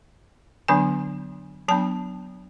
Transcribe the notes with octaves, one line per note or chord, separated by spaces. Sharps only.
D3 F#3 B3 D4 G#5
F#3 B3 D4 A5